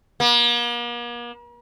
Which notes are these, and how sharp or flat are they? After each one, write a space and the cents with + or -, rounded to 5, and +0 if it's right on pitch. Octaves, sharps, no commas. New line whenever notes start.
A#3 +45